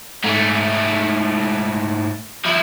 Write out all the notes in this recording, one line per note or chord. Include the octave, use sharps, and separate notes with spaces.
G#2 A3
F3 E4